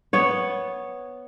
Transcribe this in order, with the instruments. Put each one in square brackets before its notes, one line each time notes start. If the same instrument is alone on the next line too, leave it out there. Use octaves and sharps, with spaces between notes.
[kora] B3 C#5